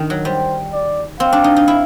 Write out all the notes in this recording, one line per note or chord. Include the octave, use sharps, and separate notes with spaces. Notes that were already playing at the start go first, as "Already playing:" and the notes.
Already playing: D#3
F#3
G3 C5
D5
C4 F5
D4
D#4
D#4
E4